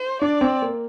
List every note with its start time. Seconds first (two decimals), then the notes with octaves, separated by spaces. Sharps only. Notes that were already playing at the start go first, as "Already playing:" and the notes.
Already playing: C5
0.22 D4 D5
0.41 C4
0.62 A#3